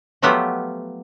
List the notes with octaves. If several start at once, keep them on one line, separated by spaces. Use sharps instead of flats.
F3 F#3 A3 B3 F4 G4